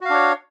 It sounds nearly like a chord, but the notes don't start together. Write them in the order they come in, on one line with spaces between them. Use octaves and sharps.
F#4 F5 D4 C#5